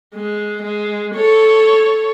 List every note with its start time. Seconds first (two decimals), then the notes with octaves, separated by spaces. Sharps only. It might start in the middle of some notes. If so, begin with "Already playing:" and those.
0.15 G#3
0.62 G#3
1.15 A4 C#5